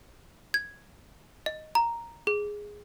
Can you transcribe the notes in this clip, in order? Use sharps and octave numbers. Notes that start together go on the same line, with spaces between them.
G#6
D#5
A#5
G#4